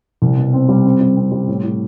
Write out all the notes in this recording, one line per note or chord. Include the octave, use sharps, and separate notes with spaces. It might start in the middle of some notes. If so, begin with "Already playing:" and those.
C2
B2
C4
G3
C4
G3
C4
G3
A2
A2